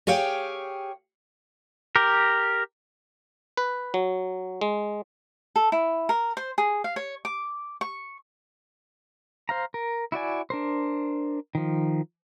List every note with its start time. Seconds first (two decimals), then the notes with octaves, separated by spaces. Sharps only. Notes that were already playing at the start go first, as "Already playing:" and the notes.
0.07 G4 G#4 C#5 F5 G5
1.96 G4 A#4
3.57 B4
3.94 F#3
4.61 G#3
5.56 A4
5.72 E4
6.09 A#4
6.37 C5
6.58 G#4
6.84 F5
6.96 C#5
7.25 D6
7.81 C#6
9.49 C5 F5 A#5
9.74 A#4
10.12 E4 F#4 D5 G#5
10.50 D4 A#4 C5
11.55 D#3 F3